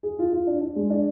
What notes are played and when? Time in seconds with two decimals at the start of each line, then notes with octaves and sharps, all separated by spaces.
0.03 G#4
0.19 F4
0.33 F4
0.47 D4
0.62 D4
0.76 G#3
0.90 D4